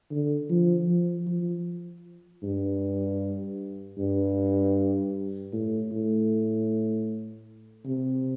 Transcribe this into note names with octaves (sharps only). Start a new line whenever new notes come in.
D3
F3
F3
F3
G2
G2
A2
A2
C3